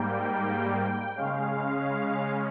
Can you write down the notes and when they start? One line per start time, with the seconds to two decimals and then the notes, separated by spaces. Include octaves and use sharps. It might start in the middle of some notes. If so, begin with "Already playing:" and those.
Already playing: G#2 G3 A#3 G5
0.74 G5
1.16 C#3 G#3 C#4 F5